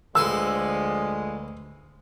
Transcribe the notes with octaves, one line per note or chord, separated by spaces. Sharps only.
D2 D3 F3 G#3 B4 C6 E6